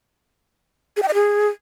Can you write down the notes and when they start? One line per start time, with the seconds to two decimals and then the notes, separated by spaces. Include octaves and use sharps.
0.97 G#4
1.02 G5
1.08 D#5
1.14 G#4